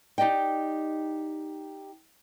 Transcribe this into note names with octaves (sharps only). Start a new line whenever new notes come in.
D#4 G4 D5 D#5 G5